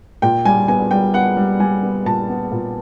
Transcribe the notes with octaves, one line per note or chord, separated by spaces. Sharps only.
A#2 G5
G3 G#5
B3 G#5
G3 G5
B3 F#5
G3
G3 G#5
B3
A#2 A5
B3
A#2